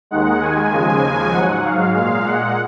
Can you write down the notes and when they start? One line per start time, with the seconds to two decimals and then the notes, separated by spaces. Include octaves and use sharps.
0.11 D#2 D#3 G#3 F#5
0.41 G#5
0.72 D#2 C#3 F3 G#3
1.32 G#2 F#3 F#5
1.64 F5
1.94 A#2 G#3 F5
2.25 F#5